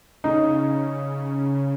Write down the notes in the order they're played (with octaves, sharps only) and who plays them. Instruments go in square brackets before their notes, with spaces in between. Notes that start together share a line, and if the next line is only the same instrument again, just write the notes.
[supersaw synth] C#3 [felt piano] D#4